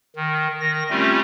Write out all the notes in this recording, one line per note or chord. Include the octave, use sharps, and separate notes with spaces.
D#3
D#3 A#6
G3 A3 C4 C#4 F4 G4